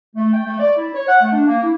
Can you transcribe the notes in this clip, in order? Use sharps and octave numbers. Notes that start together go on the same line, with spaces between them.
A3
G5
A3
D5
E4
C#5
F#5
A3
D4
A#3
E4